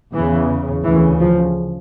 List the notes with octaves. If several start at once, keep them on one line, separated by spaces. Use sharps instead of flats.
E2 C#3 E3
D2 C#3 E3
F3